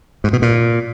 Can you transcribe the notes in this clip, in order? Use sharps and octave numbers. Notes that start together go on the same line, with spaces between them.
G#2
B2
A#2